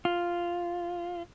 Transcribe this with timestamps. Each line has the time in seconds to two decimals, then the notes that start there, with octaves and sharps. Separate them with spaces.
0.05 F4